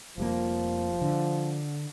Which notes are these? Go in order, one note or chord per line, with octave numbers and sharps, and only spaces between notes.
F1 F3 G3 A#3
D3